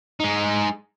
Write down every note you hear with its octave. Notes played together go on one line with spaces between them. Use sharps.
G#3 D#4